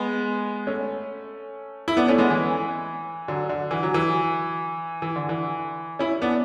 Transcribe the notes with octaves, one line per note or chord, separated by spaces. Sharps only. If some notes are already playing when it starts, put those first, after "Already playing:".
Already playing: G#3 B3
A3 C#4
E4
B3 D4
A3 C#4
G#3 B3
E3
D3 F#3
D3
E3
F#3
E3
E3
D3
E3
C#4 E4
B3 D4